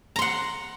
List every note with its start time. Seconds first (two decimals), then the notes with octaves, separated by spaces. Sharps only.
0.16 A#5
0.19 C6
0.22 F#5